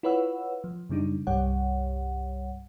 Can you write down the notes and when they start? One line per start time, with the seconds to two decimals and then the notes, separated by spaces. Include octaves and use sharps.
0.03 E4 F4 B4 C#5 F#5 E6
0.64 F3
0.89 F#2 C#3 G3 D4 D#4
1.27 C2 G2 G3 G4 C#5 F#5